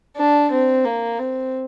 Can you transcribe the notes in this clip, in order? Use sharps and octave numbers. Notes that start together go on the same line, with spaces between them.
D4
C4
A#3
C4